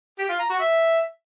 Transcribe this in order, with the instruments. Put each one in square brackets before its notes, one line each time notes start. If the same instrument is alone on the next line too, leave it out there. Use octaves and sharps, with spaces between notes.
[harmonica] G4
F4
A#5
F#4
E5